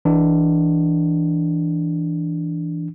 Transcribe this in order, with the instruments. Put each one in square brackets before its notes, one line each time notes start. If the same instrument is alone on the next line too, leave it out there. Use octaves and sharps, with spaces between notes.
[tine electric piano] E3 D4